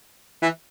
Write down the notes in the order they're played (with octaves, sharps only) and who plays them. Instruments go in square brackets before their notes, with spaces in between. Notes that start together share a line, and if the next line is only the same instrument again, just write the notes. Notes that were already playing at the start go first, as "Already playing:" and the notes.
[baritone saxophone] E3